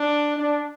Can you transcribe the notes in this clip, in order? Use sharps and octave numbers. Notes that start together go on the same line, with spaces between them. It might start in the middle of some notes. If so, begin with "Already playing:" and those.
Already playing: D4
D4